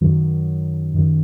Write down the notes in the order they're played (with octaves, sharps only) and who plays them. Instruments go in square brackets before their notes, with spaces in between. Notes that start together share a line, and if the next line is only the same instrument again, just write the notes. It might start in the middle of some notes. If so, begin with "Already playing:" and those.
[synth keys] F#2 D#3 F#3
F#2 D#3 F#3